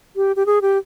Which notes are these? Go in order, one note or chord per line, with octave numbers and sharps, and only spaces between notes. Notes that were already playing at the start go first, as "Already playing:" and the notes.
G4
G4
G#4
G4